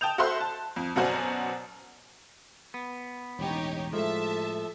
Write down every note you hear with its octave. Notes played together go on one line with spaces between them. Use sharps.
G5 A5 D#6 G6 F7
F#4 A4 C5 E5 C6 F#6
A5
F2
F#2 B2 F#4 C5 D5 G#5
B3
E1 A1 D#4 G4 C#5
A2 F3 G#3 A4 E5 A5